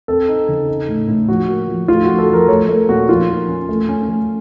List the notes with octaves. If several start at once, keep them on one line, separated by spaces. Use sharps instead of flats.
C4 A4
D#4
C#3
D#4
A2
A2
F3 F#4
A#3
F3
A3 F4
F3 F#4
A4
F3
A#4
A3 C#5
A3 A#4
A#2 F#4
F3 F4
A#3
C#4
A3
C#4
A3